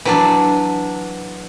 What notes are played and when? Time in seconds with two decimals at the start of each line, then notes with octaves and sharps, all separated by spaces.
0.05 E3 F#3 D4